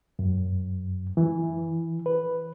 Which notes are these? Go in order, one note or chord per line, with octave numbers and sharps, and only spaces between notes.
F#2
E3
B4